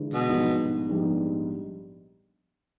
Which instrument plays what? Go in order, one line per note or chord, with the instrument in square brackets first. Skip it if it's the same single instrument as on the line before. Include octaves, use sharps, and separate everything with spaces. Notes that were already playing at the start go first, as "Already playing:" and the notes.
Already playing: [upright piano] G1 G2 E3 G#3
[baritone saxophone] B2
[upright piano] A#1 G#2 G3 B3 D#4
A#1 G#2 G3 B3 D#4